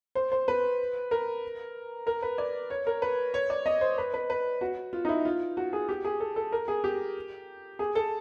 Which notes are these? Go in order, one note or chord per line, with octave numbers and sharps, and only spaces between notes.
C5
C5
B4
A#4
A#4
B4
D5
C#5
A#4
B4
C#5
D5
D#5
C5
B4
B4
B4
F#4
F4
D#4
E4
F4
F#4
G#4
G4
G#4
A4
A4
A#4
G#4
G4
G#4
A4